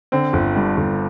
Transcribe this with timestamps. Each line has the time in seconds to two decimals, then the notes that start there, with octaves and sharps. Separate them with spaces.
0.12 D3 C4
0.33 G1
0.56 G2
0.77 G1